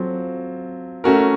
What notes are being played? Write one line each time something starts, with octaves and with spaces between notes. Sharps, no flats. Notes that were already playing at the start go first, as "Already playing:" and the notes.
Already playing: F#3 C4 F4 A4
A3 C#4 F#4 A#4